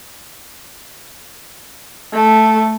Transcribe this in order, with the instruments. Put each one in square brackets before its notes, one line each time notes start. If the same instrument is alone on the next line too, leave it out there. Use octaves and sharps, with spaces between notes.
[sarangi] A3